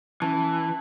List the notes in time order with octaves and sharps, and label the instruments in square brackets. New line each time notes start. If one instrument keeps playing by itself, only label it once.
[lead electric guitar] E3 [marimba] C#4 [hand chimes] A5